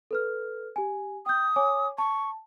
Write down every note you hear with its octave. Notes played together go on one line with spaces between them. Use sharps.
A4 B4 F6
G4 G#5
G5 D#6 G6
C#5 G#5 D6
A5 C#6